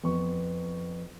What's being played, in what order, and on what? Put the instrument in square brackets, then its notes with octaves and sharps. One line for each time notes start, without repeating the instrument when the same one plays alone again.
[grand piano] F2 B3 C#6